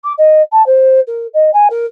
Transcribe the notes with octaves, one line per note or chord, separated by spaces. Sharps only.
D6
D#5
A5
C5
A#4
D#5
G#5
A#4